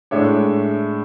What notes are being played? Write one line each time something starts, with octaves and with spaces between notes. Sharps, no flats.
A2 G#3 D4 C#5 E5